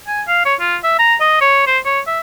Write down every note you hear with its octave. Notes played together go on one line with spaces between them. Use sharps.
G#5
F5
C#5
F4
E5
A#5
D#5
C#5
C5
C#5
E5